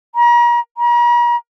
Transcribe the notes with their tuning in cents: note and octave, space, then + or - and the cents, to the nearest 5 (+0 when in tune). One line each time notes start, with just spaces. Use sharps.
A#5 +40
A#5 +45